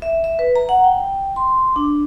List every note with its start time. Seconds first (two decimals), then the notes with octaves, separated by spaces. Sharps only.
0.02 E5
0.24 E5
0.39 B4
0.56 A#5
0.69 F#5
0.84 G5
1.36 C6
1.76 D4